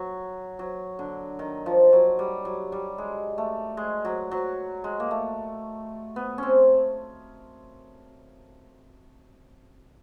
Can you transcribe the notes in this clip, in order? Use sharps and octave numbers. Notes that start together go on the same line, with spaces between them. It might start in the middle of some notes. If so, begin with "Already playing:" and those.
Already playing: F#3
F#3
D3
D#3
F3
F#3
G3
F#3
G3
G#3
A3
G#3
F#3
F#3
G#3
A#3
A3
B3
C4 C#4